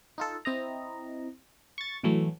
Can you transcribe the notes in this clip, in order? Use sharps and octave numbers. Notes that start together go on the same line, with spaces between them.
D#4 F4 A4
C4 E4 D#5 A#5
C#6 A6
A2 E3 F#3 A3